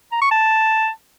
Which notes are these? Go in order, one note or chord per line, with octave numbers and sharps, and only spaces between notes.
A#5
C#6
A5